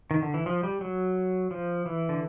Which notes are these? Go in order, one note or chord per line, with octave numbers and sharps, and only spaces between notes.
D#3
D3
E3
F3
G3
F#3
F3
E3
D3